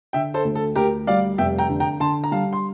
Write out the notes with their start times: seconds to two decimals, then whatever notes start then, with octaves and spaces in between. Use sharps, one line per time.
0.13 D3 E5 G5
0.34 A4 C5
0.45 D2
0.55 A4
0.76 D2 G4 A#4
1.07 G3 D5 F5
1.38 F1 E5 G5
1.58 G5 A#5
1.69 D3
1.80 G5 A#5
2.00 D3 A5 C6
2.24 A#5
2.32 G3 F5 A5
2.53 C6